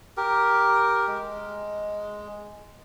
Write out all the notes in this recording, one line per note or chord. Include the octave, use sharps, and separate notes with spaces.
G4 A#4
G#3